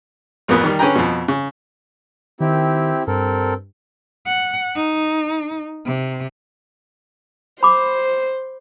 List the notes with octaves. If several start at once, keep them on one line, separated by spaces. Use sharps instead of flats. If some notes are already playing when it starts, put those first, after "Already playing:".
A1 F2 A#3 B3 D#6
D#3 G3
D3 C#4 G#4 B4 G5 A#5
F2 B2
C#3
D#3 C4 E4 G4
G2 C4 A4 A#4
F#5
D#4
C3
C5 B5 D6